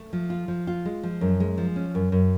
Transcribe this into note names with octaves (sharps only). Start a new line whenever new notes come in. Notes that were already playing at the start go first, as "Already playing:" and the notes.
Already playing: A3
F3
F4
F3
F4
G#3
F3
F#2
G#3
F3
C#4
F#2
F#2